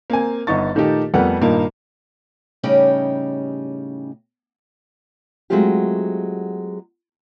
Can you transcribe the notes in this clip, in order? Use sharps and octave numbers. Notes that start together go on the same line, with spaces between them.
A#3 C4 G#5
G1 B3 D#4 C#6 A6
A#2 D#3 A3 A#3 D#4 G4
F2 G3 A3 B3 A#4 F#5
G2 A#2 D#3 A#3 D#4
A2 C#3 G3 C#4 D#4 G4
F#3 G#3 A3 C4 F4 G4